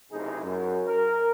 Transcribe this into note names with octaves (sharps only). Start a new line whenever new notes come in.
F#1 C3 A3 D#4 E4 G#4
F#2
A#4